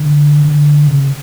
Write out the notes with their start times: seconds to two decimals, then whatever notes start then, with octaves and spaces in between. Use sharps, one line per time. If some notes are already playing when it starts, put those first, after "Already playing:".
Already playing: D3
0.44 D3
0.88 C#3